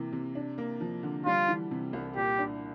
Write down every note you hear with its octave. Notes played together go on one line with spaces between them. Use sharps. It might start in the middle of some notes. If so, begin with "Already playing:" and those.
Already playing: C3 E3 A#3
C3
D4
A#3
F3
D3
G3 F4
E3
C3
C2
A#2 G4
D4